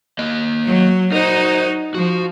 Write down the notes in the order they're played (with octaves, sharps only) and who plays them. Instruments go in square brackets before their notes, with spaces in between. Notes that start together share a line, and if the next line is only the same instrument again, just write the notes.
[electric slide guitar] A#3 D#5
[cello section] F#3
[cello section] D#4 F#4 [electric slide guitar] A#4 C5
[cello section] F3 [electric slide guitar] F#4